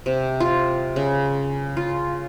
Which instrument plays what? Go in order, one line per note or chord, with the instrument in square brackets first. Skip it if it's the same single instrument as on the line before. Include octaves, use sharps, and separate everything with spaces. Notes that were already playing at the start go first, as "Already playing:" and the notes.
[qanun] C3
F4
C#3
F4